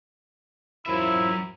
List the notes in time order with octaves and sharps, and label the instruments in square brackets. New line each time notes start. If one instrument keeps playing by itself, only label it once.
[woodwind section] F#2 F3 E4 [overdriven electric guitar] F#3 E5